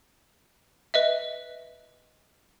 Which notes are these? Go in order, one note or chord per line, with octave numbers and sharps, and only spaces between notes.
B4 D#5 E5